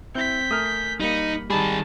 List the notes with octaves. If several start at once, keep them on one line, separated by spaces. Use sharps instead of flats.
C4 E4 E5 G6 B6
A3 A#4 G#5 D#6 F6
G3 A#3 D#4 B5 C#7
D#3 G3 D#4 G#4 A5 B5